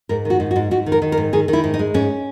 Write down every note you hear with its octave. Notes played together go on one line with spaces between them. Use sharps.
G#2 A#4
D#3 F#4
G#2
F#4
G#2
G#2 F#4
D#3
A#4
D#3
A#4
G#2
D#3 G#4
D#3
E4
G#2
D#4
G#3
G#2 C#4